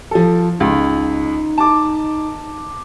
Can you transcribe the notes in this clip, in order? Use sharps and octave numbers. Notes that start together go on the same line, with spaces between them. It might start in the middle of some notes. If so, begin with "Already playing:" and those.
F3 A4
C#2 D#4
A5 D6